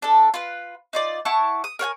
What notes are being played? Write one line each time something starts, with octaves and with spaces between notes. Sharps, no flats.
D4 A4
F4 B4
D#4 F4 D5
E4 F#5 A5 C#6
D#6
A#4 C#5 F#5 G#5